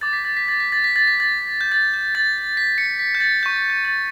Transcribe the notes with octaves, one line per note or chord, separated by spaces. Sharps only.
D6 G6 A6
B6
A6
B6
A6
B6
A6
B6
A6
B6
A6
G6
A6
G6
A6
B6
C#7
B6
G6
A6
C#6 G6
G6
A6